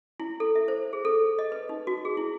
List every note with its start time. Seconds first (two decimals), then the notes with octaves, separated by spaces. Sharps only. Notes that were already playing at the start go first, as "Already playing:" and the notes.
0.20 E4
0.40 A4
0.55 E5
0.68 C5
0.93 G#4
1.05 A4
1.39 D#5
1.52 B4
1.69 D#4
1.87 F#4
2.05 G#4
2.17 E4